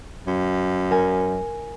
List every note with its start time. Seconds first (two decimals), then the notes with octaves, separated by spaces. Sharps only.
0.27 F#2
0.91 A#4 G#5